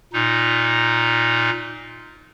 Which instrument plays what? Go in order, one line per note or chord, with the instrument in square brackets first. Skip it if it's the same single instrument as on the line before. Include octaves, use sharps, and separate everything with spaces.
[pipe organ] A#2 D#4